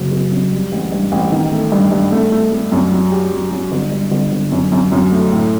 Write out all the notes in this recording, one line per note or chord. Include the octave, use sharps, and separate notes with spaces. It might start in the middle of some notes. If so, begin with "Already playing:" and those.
Already playing: F#1 F#3
F#1
F#2
G3
A1
G2
A1
D#3
A3
G2
G2
A3
A3
A3
F#2
F#3
G4
F#3
F#3
G1
G2
G1
G1
F#2
F#2
F#2
A3
A2